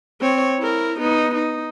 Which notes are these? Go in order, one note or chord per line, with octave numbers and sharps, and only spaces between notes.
C4 C#5
E4 A#4
B3 D#4
D#4